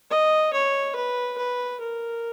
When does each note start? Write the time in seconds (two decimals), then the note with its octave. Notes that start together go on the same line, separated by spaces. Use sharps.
0.10 D#5
0.53 C#5
0.95 B4
1.38 B4
1.80 A#4